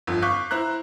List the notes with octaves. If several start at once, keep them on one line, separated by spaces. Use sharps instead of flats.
G1 F2
F5 C#6 D6 F#6 G6 B6
E4 C5 A#5 F#6